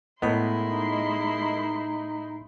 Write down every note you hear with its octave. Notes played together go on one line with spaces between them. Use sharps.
A2 G#3 B3 E4 A#4 D#5 C6
D#4